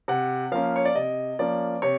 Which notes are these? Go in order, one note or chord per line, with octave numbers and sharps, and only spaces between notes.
C3 F#5
F3 A#3 C#4 F5
C#5
D5
C3 D#5
F3 A#3 C#4 D5
C3 C#5